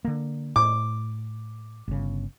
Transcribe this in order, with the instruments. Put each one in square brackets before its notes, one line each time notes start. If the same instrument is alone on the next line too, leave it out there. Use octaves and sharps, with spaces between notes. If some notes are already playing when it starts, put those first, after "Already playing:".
[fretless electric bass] D3 A#3
[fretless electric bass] A2 [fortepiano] D6
[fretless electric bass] G1 C#3